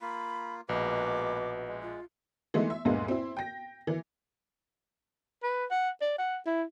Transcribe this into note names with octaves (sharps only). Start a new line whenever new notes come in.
A#3 F4 B5
A#1 B2 G#3 A#3 B4 D6
G#3
F4
E3 G#3 A3 B3 D#4 E4
E5
D2 G2 A#2 G#3 A#3 B3
C4 E4
G5 A#6
E3
B4
F#5
D5
F#5
E4